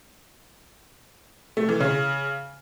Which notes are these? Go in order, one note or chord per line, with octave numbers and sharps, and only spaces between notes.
A3
E3
C#3